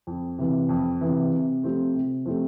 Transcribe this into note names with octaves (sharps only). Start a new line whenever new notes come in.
F2
C3 E3
F2
C3 E3
C3
F3 A3 C4 G4
C3
F3 A3 C4 G4